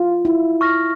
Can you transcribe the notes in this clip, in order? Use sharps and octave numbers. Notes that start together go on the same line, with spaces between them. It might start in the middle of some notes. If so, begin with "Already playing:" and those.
Already playing: F4
E4
C#6 F6 A#6